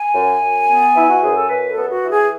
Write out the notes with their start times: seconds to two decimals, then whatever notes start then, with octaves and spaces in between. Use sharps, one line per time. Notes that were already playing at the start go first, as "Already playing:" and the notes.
Already playing: G#5
0.12 F#2
0.39 F#2
0.67 B3
0.95 E3 E4
1.10 F#4
1.22 F#2 G#4
1.36 A4
1.49 F#2 B4
1.70 A4
1.77 B3
1.90 F#4
2.04 E3
2.11 G#4